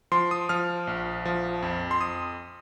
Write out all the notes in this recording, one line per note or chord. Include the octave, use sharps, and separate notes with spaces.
F3 C6
D#6
F3 F6
A#1
F3
F2
C6
F2 D#6